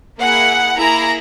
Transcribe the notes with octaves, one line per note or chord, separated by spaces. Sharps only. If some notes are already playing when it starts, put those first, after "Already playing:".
A#3 E4 G#4 F#5
A#3 E4 G#4 A#5